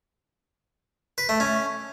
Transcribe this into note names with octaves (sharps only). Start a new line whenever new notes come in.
B4
A3
C#4